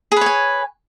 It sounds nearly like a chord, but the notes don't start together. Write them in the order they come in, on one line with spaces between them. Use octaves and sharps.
G#4 B4 C#5 G#5